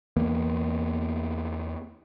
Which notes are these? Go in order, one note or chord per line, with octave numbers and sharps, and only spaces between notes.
E2 A#3 B3